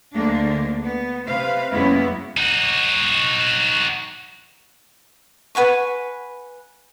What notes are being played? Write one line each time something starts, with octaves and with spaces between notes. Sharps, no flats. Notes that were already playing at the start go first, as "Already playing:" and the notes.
D2 D3 G#3 A#3 D4
B3
C3 B4 C5 F5
F#2 G#3 A#3 B3 C#4 E4
D#4 F#4
B4 F#5 G#5 C#6